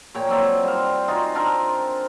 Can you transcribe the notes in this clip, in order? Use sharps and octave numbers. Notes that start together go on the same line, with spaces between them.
A#2 C#5 G5 C#6
F#3 C4 D5 E5
G3 C5 F5
D#4 F4 F#4 G#5
C4 D4 F4 A#4